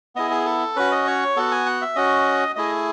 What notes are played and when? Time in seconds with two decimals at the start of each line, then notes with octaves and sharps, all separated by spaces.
0.16 B3 E4 G#4 D#5
0.31 G#4
0.46 A4
0.76 C#4 F#4 B4
0.92 D#5
1.07 C#5
1.36 B3 F#4 A4
1.51 G#5
1.66 F#5
1.81 E5
1.96 C#4 F#4 D#5
2.56 A3 E4 G#4 D#5